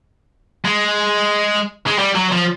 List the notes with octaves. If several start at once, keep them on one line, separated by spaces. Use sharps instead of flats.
G#3
G#3
G3
F#3
F3